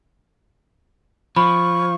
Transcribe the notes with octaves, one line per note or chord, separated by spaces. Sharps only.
F3 B5 C#6